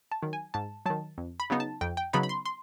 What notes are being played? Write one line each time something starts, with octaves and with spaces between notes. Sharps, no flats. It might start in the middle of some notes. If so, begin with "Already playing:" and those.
A5
D#3 F#3
G#5
G#2 A5
D#3 F#3 A5
F2
B5
C#3 F#3 B3 D#4
A5
F2 G5
G5
C#3 F#3 B3 D#4 B5
B5
C6
C6